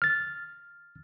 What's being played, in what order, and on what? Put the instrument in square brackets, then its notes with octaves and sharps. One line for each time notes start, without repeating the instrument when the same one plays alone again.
[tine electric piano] F6 A6